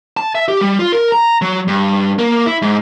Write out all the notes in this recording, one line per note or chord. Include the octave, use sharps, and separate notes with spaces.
A5
E5
G4
G3
F4
A#4
A#5
F#3
G2
A#3
E4
G#2